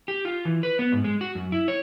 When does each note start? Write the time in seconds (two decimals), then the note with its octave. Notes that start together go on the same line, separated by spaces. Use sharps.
0.08 G4
0.25 F4
0.45 E3
0.63 B4
0.79 B3
0.92 G#2
1.04 G#3
1.21 F#4
1.35 F#2
1.52 E4
1.68 C#5